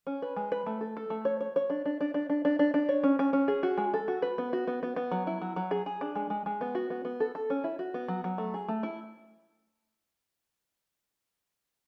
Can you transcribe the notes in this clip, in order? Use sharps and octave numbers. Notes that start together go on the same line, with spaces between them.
C#4
B4
G#3
B4
A3
A4
A4
A3
C#5
C#5
C#5
D4
D4
D4
D4
D4
D4
D4
D4
C#5
C#4
C#4
C#4
G#4
F#4
G#3
A4
F#4
B4
B3
F#4
B3
B3
B3
F#3
E4
F#3
F#3
G#4
G#4
D4
G#3
G#3
G#3
B3
F#4
B3
B3
A4
A4
C#4
E4
F#4
B3
F#3
F#3
A3
G#4
A3
E4